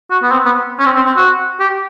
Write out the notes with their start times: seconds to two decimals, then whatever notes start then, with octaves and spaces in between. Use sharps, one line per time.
0.10 F#4
0.23 B3
0.32 C4
0.45 B3
0.79 C#4
0.85 C4
0.96 C4
1.06 C4
1.17 F#4
1.60 G4